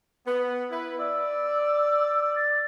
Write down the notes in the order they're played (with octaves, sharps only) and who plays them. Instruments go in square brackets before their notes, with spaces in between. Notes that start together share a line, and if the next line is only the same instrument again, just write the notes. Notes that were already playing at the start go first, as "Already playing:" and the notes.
[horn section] B3
E4 B4
[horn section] D5 [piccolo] E6
[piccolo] A6